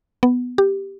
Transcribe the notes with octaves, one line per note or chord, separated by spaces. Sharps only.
B3
G4